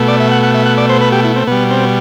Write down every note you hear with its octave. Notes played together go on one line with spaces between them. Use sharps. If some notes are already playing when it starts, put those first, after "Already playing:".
Already playing: B2 A3
D5
E5
F#5
F#5
E5
F#5
D5
C5
B4
G4
E4
C4
B2 G3 B3
C4